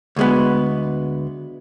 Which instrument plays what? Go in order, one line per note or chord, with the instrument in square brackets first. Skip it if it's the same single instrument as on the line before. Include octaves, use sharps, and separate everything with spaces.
[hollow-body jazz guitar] D2 G#3 B3